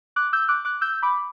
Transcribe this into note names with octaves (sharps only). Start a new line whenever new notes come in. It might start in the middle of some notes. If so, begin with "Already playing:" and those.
D6 F#6
E6 G6
D6 F#6
D6 F#6
E6 G6
B5 D6